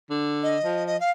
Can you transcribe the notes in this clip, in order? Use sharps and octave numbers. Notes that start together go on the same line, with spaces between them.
D3
D#5
F3
D#5
F5